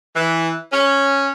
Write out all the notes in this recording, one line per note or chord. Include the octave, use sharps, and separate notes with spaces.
E3
C#4